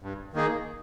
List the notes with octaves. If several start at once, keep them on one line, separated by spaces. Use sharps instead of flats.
G2
D#3 A#3 D#4 G#4